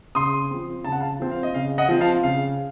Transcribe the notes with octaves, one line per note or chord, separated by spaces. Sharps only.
C#3 C6 D#6
F3 C4
C#3 A5
F#5
F5 A5
F3 C4
F5
D#5
C#3 F5
D#5 F#5
F3 C4
F5 A5
C#3 F5